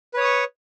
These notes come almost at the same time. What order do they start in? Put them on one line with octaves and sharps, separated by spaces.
B4 C#5 D#6 C#6